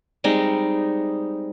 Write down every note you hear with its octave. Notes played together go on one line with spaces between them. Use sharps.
G3 G#3 C4 D#4